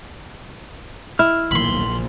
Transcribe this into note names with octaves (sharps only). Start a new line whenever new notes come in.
E4 F6
D#1 B1 A#3 B5 C6
A#1